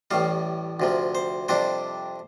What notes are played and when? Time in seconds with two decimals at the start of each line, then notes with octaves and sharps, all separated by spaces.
0.11 A1 A2 G3 F5
0.80 D2 C3 F3
1.15 C5
1.49 F2 C3 G3 D4 C5